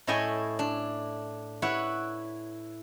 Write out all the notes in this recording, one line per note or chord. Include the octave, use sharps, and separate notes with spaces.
A2 E4 C#5 D#5 G5 G#5
D4
E4 B4 C#5 F#5